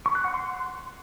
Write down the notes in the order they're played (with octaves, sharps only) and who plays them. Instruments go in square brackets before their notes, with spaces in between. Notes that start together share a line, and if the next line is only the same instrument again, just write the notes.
[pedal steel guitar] C#6
F#6
F#5
C6